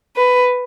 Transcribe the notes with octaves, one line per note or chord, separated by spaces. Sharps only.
B4